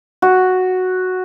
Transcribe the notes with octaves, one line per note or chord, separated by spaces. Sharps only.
F#4